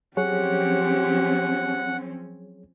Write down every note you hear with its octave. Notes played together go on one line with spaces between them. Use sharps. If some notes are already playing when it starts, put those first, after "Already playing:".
F3 F#3 C4 C#4 G4 G#4 C#5 F#5